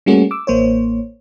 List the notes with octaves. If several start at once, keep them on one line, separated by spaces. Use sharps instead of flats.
G3 A3 A#3 C#4 F#4 G#4
D6 E6
A1 A#3 C5 C#5